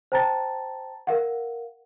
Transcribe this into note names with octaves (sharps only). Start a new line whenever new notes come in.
C5 G5 A5 A#5 A6
A#4 F5 F#5